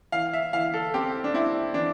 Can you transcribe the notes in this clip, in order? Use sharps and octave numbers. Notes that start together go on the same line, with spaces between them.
E3 F5
E5
E3 F5
A4
C4 G4
D4
C4 E4
E3 D4